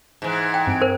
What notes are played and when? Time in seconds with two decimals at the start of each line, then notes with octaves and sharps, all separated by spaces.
0.22 G#2 E3
0.41 C6
0.54 G5
0.67 G2 C4 D7
0.81 A#4 C5